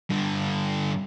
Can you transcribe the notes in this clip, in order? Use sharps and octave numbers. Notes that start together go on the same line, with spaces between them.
G2 D3